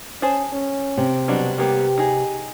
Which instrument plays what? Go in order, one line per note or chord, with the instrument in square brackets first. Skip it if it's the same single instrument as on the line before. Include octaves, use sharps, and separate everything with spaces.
[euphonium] C#4 [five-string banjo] G#4 C5 A5
[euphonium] C#4
[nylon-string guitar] C3
[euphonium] B2 [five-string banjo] F#3 G3 D4
[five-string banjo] G3 A#3 B3 [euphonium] G4
[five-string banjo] D#4 G#4